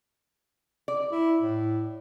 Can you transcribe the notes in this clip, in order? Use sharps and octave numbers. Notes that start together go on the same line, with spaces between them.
D5
E4
A2